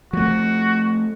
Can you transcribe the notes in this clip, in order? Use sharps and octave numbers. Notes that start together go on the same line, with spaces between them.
F3 A3 F#4